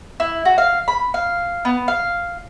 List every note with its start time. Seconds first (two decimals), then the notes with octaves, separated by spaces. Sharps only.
0.20 E4
0.45 F#4
0.58 F5
0.88 B5
1.14 F5
1.65 B3
1.88 F5